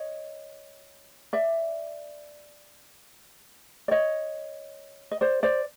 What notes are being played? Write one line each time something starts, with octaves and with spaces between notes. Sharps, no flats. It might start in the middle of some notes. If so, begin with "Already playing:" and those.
Already playing: C#5 D#5
D5 E5
D5
C#5 D#5
D#5
C5 D5
C5 D5